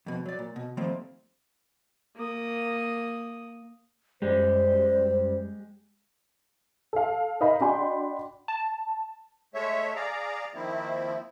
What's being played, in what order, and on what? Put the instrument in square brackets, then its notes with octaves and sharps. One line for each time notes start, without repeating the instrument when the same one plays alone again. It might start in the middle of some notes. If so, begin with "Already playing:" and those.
[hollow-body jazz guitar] F2 B2
F#3 D5
A#2
B2
D#3 F3 G3 A3 A#3 C4
[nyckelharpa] A#3 D#6
[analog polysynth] F#2 G3 [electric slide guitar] G#3 G4 [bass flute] C5
[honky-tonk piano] A4 F5
D#4 A#4 D#5 F5 A#5 B5
D4 F#4 D#5 G5 B5 C6
[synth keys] A5
[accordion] G#3 A3 C#5 E5
G#4 D5 F5 A#5
D#3 F3 A#3 C4 E4